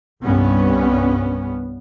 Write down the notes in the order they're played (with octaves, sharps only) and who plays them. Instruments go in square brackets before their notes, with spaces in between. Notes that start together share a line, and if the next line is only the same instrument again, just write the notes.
[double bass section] C2 G2 B3 C#4